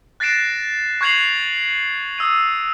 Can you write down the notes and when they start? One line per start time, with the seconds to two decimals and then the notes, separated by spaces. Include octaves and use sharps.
0.20 F#6 A6 A#6 C7 D7 E7
1.01 C#6 F#6 G#6 C7 F7 F#7
2.18 D#6 E6 G#6 D#7